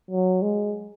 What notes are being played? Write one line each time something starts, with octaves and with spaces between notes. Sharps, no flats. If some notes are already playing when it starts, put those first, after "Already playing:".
F#3
G#3